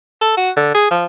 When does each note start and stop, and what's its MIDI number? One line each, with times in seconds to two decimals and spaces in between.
0.21 0.34 69
0.37 0.50 66
0.57 0.70 50
0.74 0.88 68
0.91 1.05 53